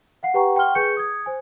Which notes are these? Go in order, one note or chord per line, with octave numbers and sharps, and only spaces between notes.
F5 F#5 C7
G4 B4 F#5 G5 A#5 C#6
F#5 G5 C6 C#6 F6 G7
G#4 B4 G#5 C#6 G6 C#7
D#6 G#6
C5 G#5